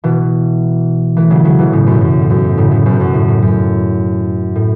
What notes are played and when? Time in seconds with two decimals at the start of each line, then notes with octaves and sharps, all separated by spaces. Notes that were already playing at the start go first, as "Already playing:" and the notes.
0.04 B2 E3
1.17 E3 A3
1.30 C#3 F#3
1.44 C#3 F#3
1.59 B2 E3
1.73 A2 C#3
1.87 F#2 B2
2.01 F#2
2.22 A2
2.30 F#2
2.44 A2
2.57 A2 C#3
2.71 A2 C#3
2.86 F#2 B2
3.00 F#2 B2
3.14 A2
3.28 A2
3.42 F#2
4.56 A2